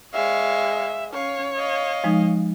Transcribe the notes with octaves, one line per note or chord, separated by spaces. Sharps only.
G#3 C#5 E5 F5
C#4 C#5 F5
D#5 F5
F3 G#3 D#4